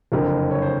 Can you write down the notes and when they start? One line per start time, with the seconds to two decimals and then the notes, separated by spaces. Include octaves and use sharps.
0.12 F#1 F2 D3 A#4
0.51 C#5
0.62 C5